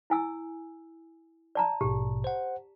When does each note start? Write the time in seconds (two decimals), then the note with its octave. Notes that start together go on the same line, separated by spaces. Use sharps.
0.10 E4 G#5 E6
1.55 D5 A5 A#5
1.81 A#1 G#2 B2 G4
2.24 C5 F#5